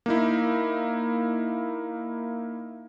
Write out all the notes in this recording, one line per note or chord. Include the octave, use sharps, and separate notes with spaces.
A#3 D#4 E4